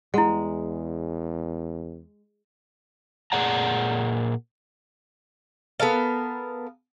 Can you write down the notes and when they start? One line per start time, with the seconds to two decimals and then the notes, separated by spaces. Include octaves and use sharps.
0.14 E2 G#3 E4 F#5
3.32 A#2 G#4 D5 F#5 A#5
5.80 B3 A4 A#4 F5